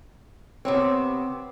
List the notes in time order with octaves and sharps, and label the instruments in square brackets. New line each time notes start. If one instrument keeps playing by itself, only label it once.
[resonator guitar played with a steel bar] C3 B3 C4 [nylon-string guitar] C#5